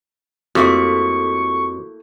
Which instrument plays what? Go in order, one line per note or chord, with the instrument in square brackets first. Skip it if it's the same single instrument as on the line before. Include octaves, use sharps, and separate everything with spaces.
[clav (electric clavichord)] F2 [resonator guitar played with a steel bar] A3 A#3 E4 [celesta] F#4 G4 D6 [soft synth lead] C#6